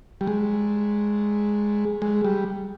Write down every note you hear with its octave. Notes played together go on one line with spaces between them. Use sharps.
G3
G#3
G#3
G3